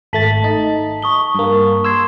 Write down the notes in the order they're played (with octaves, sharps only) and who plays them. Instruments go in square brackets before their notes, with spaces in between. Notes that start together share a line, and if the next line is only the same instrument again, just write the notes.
[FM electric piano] G#1 A3 A6 [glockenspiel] A5 B6 F#7
[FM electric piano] D#4
[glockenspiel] C#6 D#6 G7
[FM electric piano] G2 A#3
[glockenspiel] C6 G#6 C7 [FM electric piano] E6